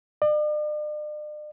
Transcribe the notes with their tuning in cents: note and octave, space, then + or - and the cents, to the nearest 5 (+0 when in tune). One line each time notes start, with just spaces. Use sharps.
D5 +40